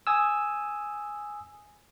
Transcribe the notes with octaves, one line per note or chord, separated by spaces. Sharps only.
G#5 D#6 E6